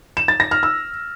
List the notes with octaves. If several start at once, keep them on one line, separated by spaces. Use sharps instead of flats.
E7
A6
A#6
F6
E6